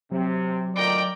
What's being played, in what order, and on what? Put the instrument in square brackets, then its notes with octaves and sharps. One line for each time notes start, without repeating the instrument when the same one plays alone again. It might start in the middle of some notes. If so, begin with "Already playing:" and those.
[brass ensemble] C3 [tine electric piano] F#3
[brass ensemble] D2 A#2 D#3 [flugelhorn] D5 [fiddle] G5 A#5